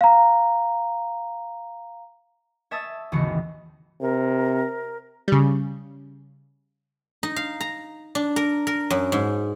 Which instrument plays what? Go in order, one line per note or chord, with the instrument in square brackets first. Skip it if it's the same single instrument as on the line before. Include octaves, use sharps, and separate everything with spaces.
[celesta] F5 A#5
[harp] C#5 E5 A5 D#6 E6 A6
G#1 D#2 C#3 E3 F#4 C#7
[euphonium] C3 [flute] A#4
[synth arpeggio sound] C#3 G3
[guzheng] D#4
F5
A#5
D4
A#4
A#4
F#2
G#2